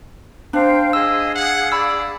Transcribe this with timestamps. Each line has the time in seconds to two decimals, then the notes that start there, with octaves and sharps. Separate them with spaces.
0.53 D4 C5 F5 G5
0.93 G#4 D#5 F5 E6
1.35 F#5
1.72 D5 B5 E6